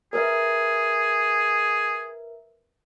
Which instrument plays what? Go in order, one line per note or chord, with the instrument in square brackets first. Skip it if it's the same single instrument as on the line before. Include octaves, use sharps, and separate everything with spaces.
[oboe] G#4 [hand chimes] A#4 B4 E5